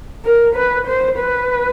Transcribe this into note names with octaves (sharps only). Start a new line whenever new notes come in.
A#4
B4
C5
B4